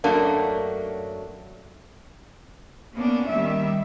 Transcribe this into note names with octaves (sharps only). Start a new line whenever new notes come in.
F#2 F#3 A3 A#3 D4
A#3 B3 C#4 D4
D#3 G3 E5